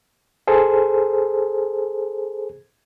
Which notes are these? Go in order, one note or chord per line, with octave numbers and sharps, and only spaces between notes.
G#4 A4 C5